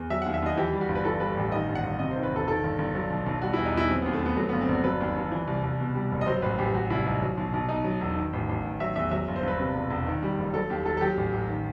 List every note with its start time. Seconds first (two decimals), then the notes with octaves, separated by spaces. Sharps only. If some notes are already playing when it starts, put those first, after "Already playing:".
Already playing: E2
0.10 F#3 E5
0.22 D#2 F#5
0.34 E5
0.42 D#2 D#5
0.57 E3 G4
0.73 G3
0.81 F#4
0.88 G1
0.95 B4
1.05 E3 A4
1.20 G3 B4
1.37 A1
1.52 D#3 D#5
1.68 G1
1.75 F#5
1.83 G1
1.99 C3 D#5
2.11 C5
2.16 D#3
2.23 B4
2.31 E1 A4
2.47 D#3 A4
2.64 G1
2.78 G1
2.95 F#3
3.10 B1
3.26 B1
3.42 G3 F#4
3.53 E2 E4
3.66 D#4
3.74 E2 E4
3.89 F#3 C4
4.02 D#2 B3
4.13 A3
4.21 D#2 B3
4.37 F#3 A3
4.49 G1 B3
4.61 C4
4.68 G1 F#4
4.84 F#3 B4
5.00 D#2
5.16 D#2
5.31 E3
5.47 C2
5.63 C2
5.80 B2
5.95 G3
6.12 F#1
6.21 D#5
6.26 F#3 C5
6.42 A1 B4
6.58 A1 G4
6.74 F#3 F#4
6.90 C2 E4
7.06 C2 D#4
7.22 F#3
7.37 B1
7.53 B1
7.69 B2 D#4
7.84 F#3
8.01 E1
8.16 D#3
8.33 A1
8.49 A1
8.64 D#3
8.80 F#3 E5
8.96 E2 E5
9.11 F#3 E5
9.28 G1
9.36 C5
9.43 G1 B4
9.60 C3
9.75 E1
9.90 E1
10.06 D#3
10.23 G3
10.37 F#1
10.54 F#3 A4
10.70 D#2 G4
10.85 D#2 A4
10.97 A4
11.01 F#3 G4
11.17 A1
11.34 A1
11.49 D#3